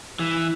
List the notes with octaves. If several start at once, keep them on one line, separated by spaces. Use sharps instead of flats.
E3